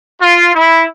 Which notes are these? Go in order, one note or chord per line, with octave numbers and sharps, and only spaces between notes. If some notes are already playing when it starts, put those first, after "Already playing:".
F4
E4